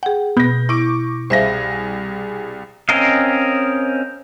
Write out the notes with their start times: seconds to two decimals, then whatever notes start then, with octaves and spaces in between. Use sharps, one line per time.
0.03 G#4 F#5 G5
0.37 B2 B3 G6 A#6
0.69 E4 C#6 D6 D7
1.30 C2 G#4 C5 E5 F5 A#6
2.89 C4 C#4 A#4 D#5 F5